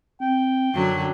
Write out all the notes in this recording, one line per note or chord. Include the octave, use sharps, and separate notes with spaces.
C4 G5
F#2 D3 F#3